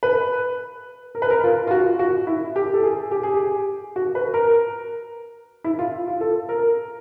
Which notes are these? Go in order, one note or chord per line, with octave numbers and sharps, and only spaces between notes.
B4
A#4
B4
A#4
F4
F4
F#4
F#4
E4
G4
A4
G#4
G4
G#4
G4
F#4
B4
A#4
E4
F4
F4
A4
A#4